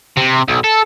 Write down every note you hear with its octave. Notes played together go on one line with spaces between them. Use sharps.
C3
B1
A4